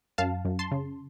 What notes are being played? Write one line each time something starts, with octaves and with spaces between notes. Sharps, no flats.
F#2 F5 A5
F#2
A5 C6
C#3